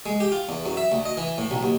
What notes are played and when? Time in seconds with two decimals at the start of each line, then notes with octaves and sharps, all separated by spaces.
0.06 G#3
0.20 G4
0.32 F4
0.49 E2
0.66 F#2
0.77 E5
0.92 D2
1.06 D#5
1.17 E3
1.38 A2
1.51 B1
1.63 D#2